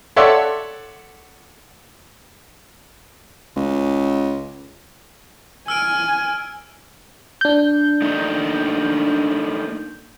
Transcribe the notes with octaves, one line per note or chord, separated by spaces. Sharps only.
A4 C#5 D5 E5 F#5 C6
C#2
G#5 E6 F6 D7
D4 G6
A3 A#3 D#4